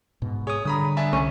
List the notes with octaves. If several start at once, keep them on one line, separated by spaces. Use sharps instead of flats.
G#2 B2
G#4 C#5 D#6
D3 G3 A#5 B5 D#6
D4 E5 G#5
C2 C#4